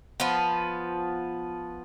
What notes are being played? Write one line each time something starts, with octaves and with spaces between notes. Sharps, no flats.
F3 B3